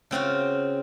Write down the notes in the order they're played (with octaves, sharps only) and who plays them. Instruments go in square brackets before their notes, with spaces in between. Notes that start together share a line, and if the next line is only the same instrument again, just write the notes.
[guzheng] C#3 C4 F4 F#4